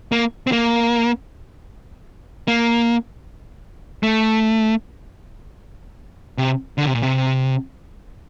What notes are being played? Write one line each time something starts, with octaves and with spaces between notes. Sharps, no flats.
A#3
C4
A#3
A#3
A3
C3
D3
C3
A#2
C3